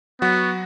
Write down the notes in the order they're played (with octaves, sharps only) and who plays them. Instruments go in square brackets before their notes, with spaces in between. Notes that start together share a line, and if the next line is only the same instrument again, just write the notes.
[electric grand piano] F#3 F#4 [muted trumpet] B3